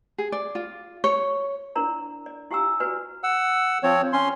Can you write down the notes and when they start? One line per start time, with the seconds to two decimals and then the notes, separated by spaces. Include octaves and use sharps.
0.18 G#4
0.32 D5
0.55 F4
1.04 C#5
1.75 D4 E4 A#4 D5 A#5
2.26 D5
2.51 E4 G4 F5 G#5 A#5 E6
2.80 F#4 B4 D5 G#5
3.23 F#5 E6
3.83 F3 C4 C#5
4.13 C#4 C6